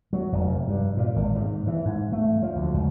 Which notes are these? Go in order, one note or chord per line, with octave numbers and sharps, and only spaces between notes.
F#3
F1
G2
A#2
G#1
G#2
E3
G#2
A3
F3
D2
C#2